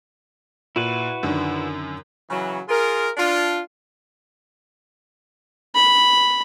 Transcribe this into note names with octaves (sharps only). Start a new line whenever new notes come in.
A#2 E4 F#4 B4
F#2 D3 D#3
C#3 E3 F#3
F4 G#4 A#4
D4 F4
B5